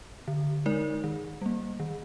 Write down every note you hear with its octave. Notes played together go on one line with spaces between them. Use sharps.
D3
G#3 D#4 A#4 D5
D#3
G3 A#3
D#3